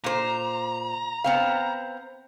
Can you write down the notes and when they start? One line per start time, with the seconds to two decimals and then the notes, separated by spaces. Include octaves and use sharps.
0.04 A#2 C5 A#5
1.24 B3 C4 F5